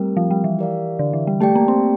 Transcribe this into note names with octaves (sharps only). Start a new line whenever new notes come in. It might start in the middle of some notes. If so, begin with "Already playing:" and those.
Already playing: G3 A3 C4 G4 A#4
F3
G3
E3
E4 G4 A#4 D5 F5
D3
E3
G3
A3 G4 D5 G5
A#3
C4